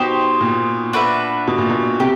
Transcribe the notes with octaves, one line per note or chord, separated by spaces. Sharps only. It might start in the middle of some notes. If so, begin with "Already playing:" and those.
Already playing: B2 D#4 G4 C5
A#2
D4 F#4 B4 E5
B2
A#2
B2
C3 G4